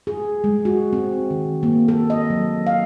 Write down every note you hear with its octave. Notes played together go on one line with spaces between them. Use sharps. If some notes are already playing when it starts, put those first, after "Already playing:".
G#4
G#3
F#4
C4
D#3
A#3
A4
D#5
F#3
F5